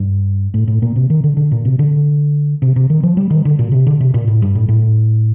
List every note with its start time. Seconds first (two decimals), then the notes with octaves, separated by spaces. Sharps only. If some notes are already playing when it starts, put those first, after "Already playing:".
Already playing: G2
0.54 A2
0.68 A2
0.82 A#2
0.96 C3
1.10 D#3
1.24 D3
1.37 D3
1.52 A#2
1.65 C3
1.79 D3
2.62 C3
2.76 C3
2.90 D#3
3.03 F3
3.17 G3
3.30 D#3
3.45 D3
3.59 A#2
3.72 C3
3.87 D3
4.00 C3
4.14 A#2
4.27 A2
4.42 G2
4.55 A2
4.68 A2